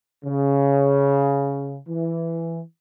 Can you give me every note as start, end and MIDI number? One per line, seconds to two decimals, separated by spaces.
0.25 1.77 49
1.88 2.61 52